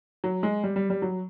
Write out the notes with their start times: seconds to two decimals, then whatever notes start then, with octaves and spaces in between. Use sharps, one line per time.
0.24 F#3
0.43 G#3
0.64 G3
0.76 G3
0.90 G3
1.02 F#3